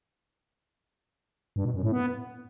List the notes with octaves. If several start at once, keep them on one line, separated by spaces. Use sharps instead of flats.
G2
B2
F#2
A2
B3